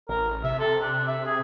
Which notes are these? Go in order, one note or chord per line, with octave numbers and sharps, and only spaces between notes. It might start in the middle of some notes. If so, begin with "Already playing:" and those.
A1 A#4
C3 E5
A4
D4
E5
G#4